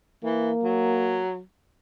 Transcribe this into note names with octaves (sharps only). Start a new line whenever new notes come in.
E3 A#3
F#3